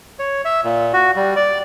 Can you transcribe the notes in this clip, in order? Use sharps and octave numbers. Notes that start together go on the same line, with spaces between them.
C#5
E5
A#2
F#4
G3
D5